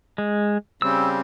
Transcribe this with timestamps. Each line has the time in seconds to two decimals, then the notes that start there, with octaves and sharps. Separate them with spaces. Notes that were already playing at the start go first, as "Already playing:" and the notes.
0.18 G#3
0.82 C#3 G3 C4 E6